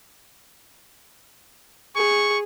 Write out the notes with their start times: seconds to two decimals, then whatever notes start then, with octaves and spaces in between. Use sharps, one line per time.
1.96 G#4 C#6